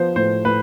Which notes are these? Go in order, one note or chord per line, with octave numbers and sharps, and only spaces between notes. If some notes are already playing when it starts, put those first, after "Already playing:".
Already playing: F3 B3 C5
A2 C5
A2 B4